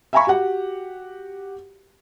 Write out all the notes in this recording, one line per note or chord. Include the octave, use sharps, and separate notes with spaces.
E5 F5 G#5 A#5 B5 C#6
F#4 G4 F#5